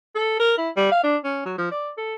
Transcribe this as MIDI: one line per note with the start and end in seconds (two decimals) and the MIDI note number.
0.15 0.38 69
0.40 0.53 70
0.58 0.69 64
0.77 0.91 55
0.92 1.03 77
1.03 1.16 62
1.24 1.42 61
1.45 1.53 54
1.58 1.71 53
1.71 1.90 74
1.97 2.16 69